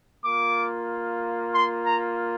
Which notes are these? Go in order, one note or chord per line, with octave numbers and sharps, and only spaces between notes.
A#3 F4 D6
C6
A#5